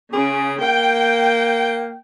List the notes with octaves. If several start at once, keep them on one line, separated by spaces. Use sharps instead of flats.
C#3 G#4
A#3 G5